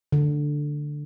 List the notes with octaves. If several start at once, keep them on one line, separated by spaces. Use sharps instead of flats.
D3